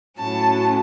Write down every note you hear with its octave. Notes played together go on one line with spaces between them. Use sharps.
A2 F#3 C#4 A5